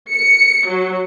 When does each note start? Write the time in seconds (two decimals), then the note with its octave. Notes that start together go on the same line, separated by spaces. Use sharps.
0.13 C#7
0.69 F#3